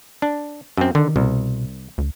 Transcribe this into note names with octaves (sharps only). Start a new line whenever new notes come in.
D4
F#2 C4
D3 D#3
C2 B2
D2